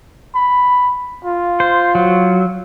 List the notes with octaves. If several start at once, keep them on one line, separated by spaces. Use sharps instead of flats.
B5
F4
C5
F#3